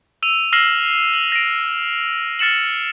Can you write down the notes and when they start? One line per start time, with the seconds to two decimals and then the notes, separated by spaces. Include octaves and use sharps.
0.23 E6 D#7 F7
0.53 E6 F6 A#6 C7 E7 F#7
1.14 F7 F#7
1.32 A#6 D7
2.39 F6 A6 C#7 E7 F#7